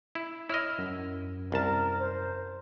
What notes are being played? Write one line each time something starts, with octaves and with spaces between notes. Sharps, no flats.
E4
E4 C#5 D#5 E6 F6
F#2
C2 A#4 A5
C5